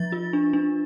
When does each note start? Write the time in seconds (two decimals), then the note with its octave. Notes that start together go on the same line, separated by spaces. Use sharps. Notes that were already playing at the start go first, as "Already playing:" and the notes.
Already playing: F3 A6
0.12 F4
0.33 D4
0.53 D4